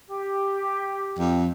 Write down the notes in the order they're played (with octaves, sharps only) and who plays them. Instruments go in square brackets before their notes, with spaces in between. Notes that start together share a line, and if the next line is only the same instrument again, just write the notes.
[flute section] G4
[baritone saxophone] F2